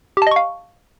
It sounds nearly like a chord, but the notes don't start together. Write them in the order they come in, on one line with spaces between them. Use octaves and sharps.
G4 A5 D#5 C#6 F5